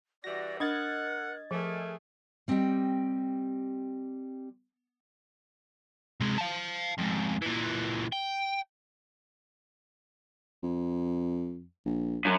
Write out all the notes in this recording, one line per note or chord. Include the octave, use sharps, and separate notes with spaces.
E3 G3 F#4 D5 A#6
D4 A#4 D#5 F#5 G#6 A6
F3 A3 G#4 A#4
G3 C4 G4 D#5 G5
C3 G#3
F5 A5
F2 G#2
A#2 E3
G5
F2
A#1
F#2